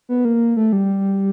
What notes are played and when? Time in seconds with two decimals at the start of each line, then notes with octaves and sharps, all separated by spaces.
0.09 B3
0.25 A#3
0.57 A3
0.73 G3